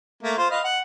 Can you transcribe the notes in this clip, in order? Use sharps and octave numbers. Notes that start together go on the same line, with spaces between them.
A3 A#3
F4 C5
B4 D#5 F5
F#5